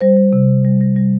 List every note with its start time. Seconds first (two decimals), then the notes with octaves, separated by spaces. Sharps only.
0.01 G3 C5
0.17 G3
0.33 C3
0.49 C3
0.65 G3
0.81 G3
0.96 G3